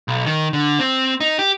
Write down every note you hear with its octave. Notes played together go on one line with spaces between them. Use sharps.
B1
D#3
D3
C4
D#4
G4